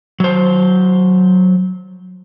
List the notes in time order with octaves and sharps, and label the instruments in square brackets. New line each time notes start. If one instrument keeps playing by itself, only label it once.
[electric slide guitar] F#3 C5